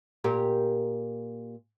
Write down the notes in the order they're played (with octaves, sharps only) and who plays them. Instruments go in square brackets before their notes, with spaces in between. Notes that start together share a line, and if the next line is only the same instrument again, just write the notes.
[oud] A#2 G4 A#4